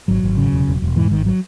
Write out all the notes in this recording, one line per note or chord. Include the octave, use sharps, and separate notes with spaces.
G#1 F#3
G#1
C#3
E1
E1
E1
G#2 E3
G#1 D#3
F#3